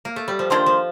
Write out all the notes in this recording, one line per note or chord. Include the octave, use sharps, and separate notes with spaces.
A#3
A3
G3
F3
D#3 A#3 D4 F4 C5
F3